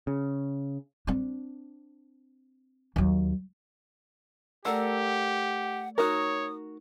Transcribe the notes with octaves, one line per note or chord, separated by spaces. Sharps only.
C#3
C4 D4
D#2 F#3
A3 G4 A4 A#4 D5 F#5 E6
D#4 F#4 A#4 C#5 D#6